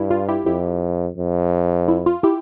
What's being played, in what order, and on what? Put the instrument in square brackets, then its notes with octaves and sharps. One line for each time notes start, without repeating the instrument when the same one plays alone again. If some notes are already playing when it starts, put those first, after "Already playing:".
Already playing: [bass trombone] G2 [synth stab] E4
[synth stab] F4
E4 G4
[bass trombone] F2 [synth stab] E4 G4
[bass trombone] F2
[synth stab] E4
F4
E4 G4